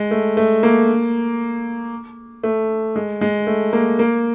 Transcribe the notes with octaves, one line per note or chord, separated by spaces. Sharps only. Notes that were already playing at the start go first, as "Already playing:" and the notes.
Already playing: G#3
A3
A3
A#3
A3
G#3
G#3
A3
A#3
A#3